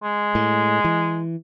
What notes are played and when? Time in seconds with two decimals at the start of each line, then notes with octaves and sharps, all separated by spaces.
0.03 G#3
0.35 A2
0.84 E3